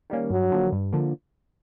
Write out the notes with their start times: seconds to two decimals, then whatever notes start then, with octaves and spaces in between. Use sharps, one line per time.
0.10 D#3 G3 A#3 C#4
0.30 G2 F#3
0.52 D3 F3 A#3
0.72 G2
0.93 D3 F3 A#3